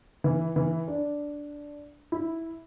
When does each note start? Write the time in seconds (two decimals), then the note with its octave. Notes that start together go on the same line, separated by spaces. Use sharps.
0.24 E3
0.56 E3
0.88 D4
2.12 E4